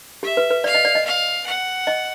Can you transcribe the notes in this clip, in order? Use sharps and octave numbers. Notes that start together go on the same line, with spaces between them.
G4 E5
B4
B4
D5 F5
D#5
D5
D#5
F5
F#5
D#5